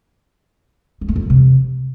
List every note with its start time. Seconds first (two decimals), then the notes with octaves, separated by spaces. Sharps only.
1.01 F#3
1.09 A3
1.16 F2
1.23 A#2
1.30 C3